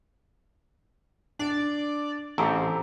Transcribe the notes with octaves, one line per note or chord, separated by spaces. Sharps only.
D4 D5
A1 C4 G4 A4 A#5